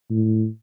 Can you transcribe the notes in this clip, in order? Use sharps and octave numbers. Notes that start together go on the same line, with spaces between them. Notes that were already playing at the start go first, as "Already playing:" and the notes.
A2